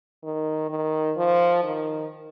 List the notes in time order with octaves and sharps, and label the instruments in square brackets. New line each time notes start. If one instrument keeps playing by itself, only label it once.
[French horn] D#3
D#3
F3
D#3